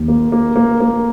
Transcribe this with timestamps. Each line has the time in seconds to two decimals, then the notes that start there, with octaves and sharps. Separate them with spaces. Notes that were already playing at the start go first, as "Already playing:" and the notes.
Already playing: D#2
0.08 A#3
0.32 A#3
0.56 A#3
0.80 A#3